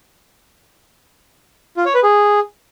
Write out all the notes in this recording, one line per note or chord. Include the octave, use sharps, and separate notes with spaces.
F4
C#5
B4
G#4